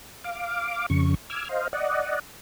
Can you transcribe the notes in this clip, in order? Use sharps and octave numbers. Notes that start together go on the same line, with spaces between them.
F5 D6
F2 C#3 C#6
D6 E6 F6 G#6
C5 D#5 F5
D5 D#5 F#5